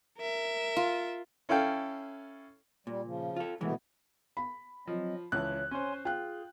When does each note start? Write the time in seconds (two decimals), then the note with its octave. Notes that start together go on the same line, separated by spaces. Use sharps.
0.18 A#4 E5
0.76 F4
1.49 C#4 E4 A4 F5 G5
2.87 A#2 G3
3.04 C#3 F3
3.36 F4 A4
3.61 C2 B2 E3 G#3 A3 B3
4.37 B5
4.87 F3 F#3 C4 D#5
5.32 C#2 E3 C#5 A5 F#6
5.71 C#4 C5 C#5 G#5 C6
6.05 F4 G#4 G5 F#6